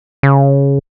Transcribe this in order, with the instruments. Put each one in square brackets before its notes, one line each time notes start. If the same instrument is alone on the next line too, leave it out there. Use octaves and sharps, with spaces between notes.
[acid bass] C#3